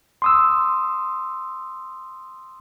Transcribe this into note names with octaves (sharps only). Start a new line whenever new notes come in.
C6 D#6 E6